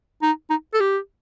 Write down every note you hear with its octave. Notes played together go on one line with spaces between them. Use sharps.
D#4
D#4
A4
G4